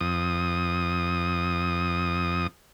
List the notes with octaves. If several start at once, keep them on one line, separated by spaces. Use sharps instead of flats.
F2 D#6